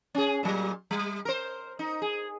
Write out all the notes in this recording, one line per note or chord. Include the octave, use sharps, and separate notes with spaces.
C#4 G#4
A#2 F#3
G3
A#4 C5
D#4
G#4